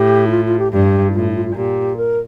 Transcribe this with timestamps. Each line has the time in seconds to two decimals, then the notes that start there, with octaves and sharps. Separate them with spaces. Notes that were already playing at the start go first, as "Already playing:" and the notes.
Already playing: A2 G4
0.27 E4
0.31 F4
0.45 F4
0.59 G4
0.72 G2 G4
1.10 E4
1.14 A2 F4
1.30 E4
1.35 F4
1.46 F4
1.56 A#2 G4
1.97 A#4